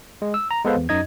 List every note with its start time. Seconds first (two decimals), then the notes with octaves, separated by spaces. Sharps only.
0.22 G#3
0.34 E6
0.51 A#5
0.64 G#3 B3 A4 B4 C5 F5
0.77 E2
0.89 F#2 D#4 D#5 G#6